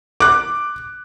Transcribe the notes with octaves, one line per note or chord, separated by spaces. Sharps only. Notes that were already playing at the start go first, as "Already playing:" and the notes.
D6 F#6